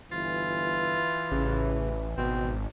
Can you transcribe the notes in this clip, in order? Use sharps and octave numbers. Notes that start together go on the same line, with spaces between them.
G1 E3 F4
A1 C#3
G#1 B2 C4